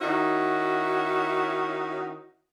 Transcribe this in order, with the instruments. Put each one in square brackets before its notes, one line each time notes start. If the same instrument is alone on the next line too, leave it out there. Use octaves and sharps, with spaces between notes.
[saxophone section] D#3 C#4 D#4 E4 F#4